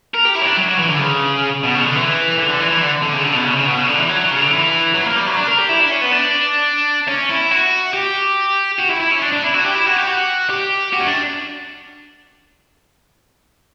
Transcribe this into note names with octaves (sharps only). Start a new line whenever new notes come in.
A#4
G4
E4
C#4
D4
F#3
F#3
E3
D3
C#3
B2
C#3
D3
E3
D3
D3
E3
E3
D3
D3
C#3
D3
B2
C#3
C#3
B2
C#3
D3
E3
F#3
F#3
C#3
D3
E3
F#3
A#3
G3
F#3
D4
A#4
G4
E4
D4
C#4
B3
D4
C#4
E4
F#4
G4
F#4
E4
E4
C#4
D4
D4
E4
F#4
G4
E4
F#4
G4
F#4
G4
F#4
C#4
D4